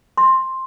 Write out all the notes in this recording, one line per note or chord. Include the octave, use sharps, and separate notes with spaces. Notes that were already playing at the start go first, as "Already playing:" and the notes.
C6